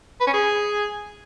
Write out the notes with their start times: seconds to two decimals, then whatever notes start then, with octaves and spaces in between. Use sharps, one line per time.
0.20 B4
0.27 C#4
0.33 G#4